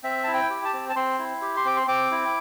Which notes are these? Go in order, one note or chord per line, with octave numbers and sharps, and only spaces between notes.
C4 E5
E4 A5
G5
G4
A5
C4
A5
C4 C6
E4
G4
C6
C4 D6
C6
C4 D6
E4